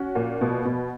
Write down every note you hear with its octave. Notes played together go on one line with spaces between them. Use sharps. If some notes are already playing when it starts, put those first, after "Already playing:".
Already playing: C#4 F#4
A#2
B2
B2